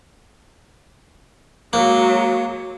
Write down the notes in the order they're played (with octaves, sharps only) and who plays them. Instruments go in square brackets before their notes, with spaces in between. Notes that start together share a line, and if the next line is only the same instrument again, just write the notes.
[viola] F#3 G#3 [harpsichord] A#3